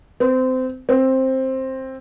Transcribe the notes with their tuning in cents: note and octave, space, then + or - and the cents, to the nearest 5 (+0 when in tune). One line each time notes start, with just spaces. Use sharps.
C4 -25
C4 +10